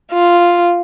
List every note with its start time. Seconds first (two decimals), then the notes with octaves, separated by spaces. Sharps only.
0.12 F4